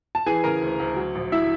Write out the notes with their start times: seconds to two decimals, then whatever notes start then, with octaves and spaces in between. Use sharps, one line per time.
0.15 A5
0.26 E3 G#4 G#5
0.44 C#3 A#4 A#5
0.61 D2
0.80 D2
0.96 F#3
1.15 A#1
1.32 F#3 E4 E5